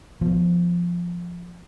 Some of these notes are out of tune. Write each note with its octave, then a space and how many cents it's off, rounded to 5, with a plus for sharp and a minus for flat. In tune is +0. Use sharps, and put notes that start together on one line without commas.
F3 +0 B3 +0